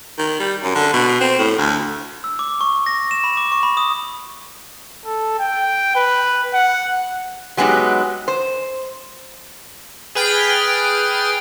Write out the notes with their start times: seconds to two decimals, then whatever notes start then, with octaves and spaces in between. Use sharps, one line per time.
0.18 D#3
0.40 G3
0.63 F#2
0.75 D3
0.93 B2
1.21 C4
1.38 A2
1.58 D2
2.24 E6
2.39 D6
2.61 C#6
2.86 A#6
3.11 E7
3.24 B5
3.37 D6
3.52 C#6
3.63 B5
3.77 D#6
5.06 A4
5.39 G5
5.96 B4
6.54 F#5
7.57 F#3 G#3 A3 B3 D#4 G4
8.28 C5
10.15 G#4 B4 G5 F6 A6